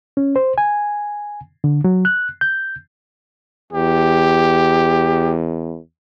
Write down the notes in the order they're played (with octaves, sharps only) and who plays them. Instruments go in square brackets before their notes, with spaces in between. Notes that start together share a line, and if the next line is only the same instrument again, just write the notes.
[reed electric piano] C#4
C5
G#5
D3
F#3
F#6
G6
[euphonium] E2 [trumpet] G4